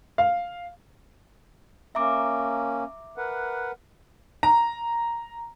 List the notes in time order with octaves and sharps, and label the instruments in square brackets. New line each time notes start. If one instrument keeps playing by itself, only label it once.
[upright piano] F5
[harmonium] A#3 C#4 [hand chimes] E5 A#5 D6
[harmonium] A#4 B4 F#5
[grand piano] A#5